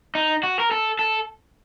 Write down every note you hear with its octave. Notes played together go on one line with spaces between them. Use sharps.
D#4
F#4
A#4
A4
A4